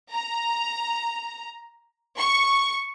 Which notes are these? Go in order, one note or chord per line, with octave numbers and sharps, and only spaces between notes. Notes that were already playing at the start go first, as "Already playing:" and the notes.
A#5
C#6